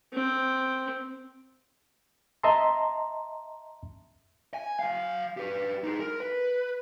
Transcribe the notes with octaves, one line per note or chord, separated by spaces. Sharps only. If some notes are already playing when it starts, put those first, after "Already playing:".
C4
D#5 E5 A5 A#5 C6
G#5
F#3 F5
G4 B4
D#4 G#4
A#4
B4